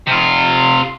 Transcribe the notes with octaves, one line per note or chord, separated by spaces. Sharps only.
C3 F4